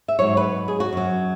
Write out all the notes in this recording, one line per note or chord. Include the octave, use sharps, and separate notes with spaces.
E5
G#2 F#3 C#5
B4
G#4
F#4
F#2 F#3